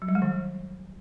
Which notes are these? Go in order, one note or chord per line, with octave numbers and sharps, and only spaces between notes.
F#3
G3
G#3
D#3